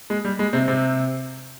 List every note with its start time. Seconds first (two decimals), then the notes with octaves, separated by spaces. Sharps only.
0.10 G#3
0.25 G3
0.39 G#3
0.53 C3 C4
0.68 C3 C4